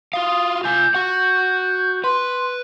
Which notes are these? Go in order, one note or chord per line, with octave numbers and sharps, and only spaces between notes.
F4 F#4 F5 D#6
F4 G#5 G6
F#4 F#5
B4 C6